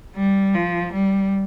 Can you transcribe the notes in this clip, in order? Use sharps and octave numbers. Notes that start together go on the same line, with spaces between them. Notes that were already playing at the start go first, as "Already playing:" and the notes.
G3
F3
G3